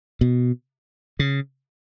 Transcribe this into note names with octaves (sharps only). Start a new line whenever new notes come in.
B2
C#3